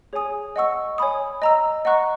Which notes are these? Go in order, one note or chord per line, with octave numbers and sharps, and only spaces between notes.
G#4 C#5 G#5 D#6
D#5 F#5 C#6 E6
C#5 G#5 B5 D#6
D#5 A#5 E6
D#5 F#5 A#5 C#6 F#6